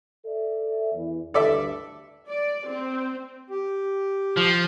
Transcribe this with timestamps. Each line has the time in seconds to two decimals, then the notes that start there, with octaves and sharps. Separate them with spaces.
0.25 A4 D5 E5
0.94 E2 E3
1.34 D2 G2 A4 D5 E5
2.29 D5
2.67 C4
3.50 G4
4.37 F3